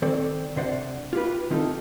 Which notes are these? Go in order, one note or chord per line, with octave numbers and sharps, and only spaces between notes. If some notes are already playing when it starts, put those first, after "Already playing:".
D#3 C4 A4 C5 D5
C3 D4 C5 D5 F#5
F4 G4 B4
D#3 C4 D#4 F4 G4 A4